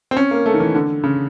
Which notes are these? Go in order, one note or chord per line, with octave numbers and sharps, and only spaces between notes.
C4
C#4
A#3
A3
D#3
E3
D3
C#3